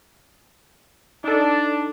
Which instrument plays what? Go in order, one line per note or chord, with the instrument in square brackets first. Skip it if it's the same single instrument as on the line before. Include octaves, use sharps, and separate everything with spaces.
[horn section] D4 [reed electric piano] D#4 A4